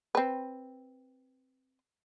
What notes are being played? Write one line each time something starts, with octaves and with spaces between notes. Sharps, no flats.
C4 B4